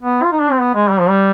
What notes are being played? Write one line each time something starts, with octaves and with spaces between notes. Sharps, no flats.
B3
F4
D#4
D4
C4
B3
G#3
G3
F3
G3